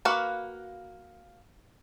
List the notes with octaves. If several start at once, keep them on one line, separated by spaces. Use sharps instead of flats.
A#3 F#4 B4 F5 F#5